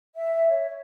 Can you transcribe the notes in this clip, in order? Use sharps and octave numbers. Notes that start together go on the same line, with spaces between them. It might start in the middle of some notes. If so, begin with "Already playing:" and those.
E5
C#5